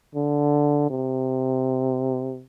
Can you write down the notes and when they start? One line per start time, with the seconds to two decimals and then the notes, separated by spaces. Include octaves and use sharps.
0.15 D3
0.90 C3